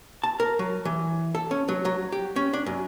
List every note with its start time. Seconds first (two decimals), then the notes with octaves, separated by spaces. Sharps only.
0.24 A5
0.40 A#4
0.59 F#3
0.85 E3
1.35 A4
1.51 C#4
1.69 F#3
1.85 F#3
2.12 G4
2.36 C#4
2.53 D4
2.66 F#2